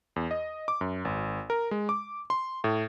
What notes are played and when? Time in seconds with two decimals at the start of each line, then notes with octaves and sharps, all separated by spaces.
0.16 E2
0.31 D#5
0.68 D6
0.81 F#2
1.05 G#1
1.50 A#4
1.71 G#3
1.89 D6
2.30 C6
2.64 A2